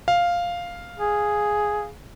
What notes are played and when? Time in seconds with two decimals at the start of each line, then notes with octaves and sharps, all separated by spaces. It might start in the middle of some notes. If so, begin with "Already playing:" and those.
0.08 F5
0.99 G#4